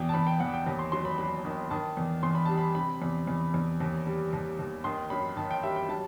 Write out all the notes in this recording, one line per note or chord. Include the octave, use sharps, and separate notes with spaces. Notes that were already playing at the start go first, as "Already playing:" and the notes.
Already playing: E2 B2 G5
A5
E2 B5
G5
E2 F#5
G5
D#2
C6
F#3 C6
B5
F#3 B5
D#3
D#3 A5
E2
E2 C6
B5
G3 A5
B5
C3 B5
E2
E2
E2
D#2
G3
D#2
D#2
D#3 C6
F#2 B5
D#3 A5
G5
G3 E5
G5
F#3 A5